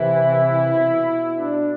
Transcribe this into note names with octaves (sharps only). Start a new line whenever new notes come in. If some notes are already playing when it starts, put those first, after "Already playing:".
Already playing: C3 E3 E4
B2
D4